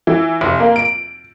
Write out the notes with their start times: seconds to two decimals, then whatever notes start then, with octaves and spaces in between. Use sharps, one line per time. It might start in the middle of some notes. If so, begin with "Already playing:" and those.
0.07 E3
0.41 F1
0.60 A#3
0.76 D7